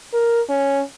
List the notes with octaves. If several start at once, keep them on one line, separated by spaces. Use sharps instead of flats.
A#4
C#4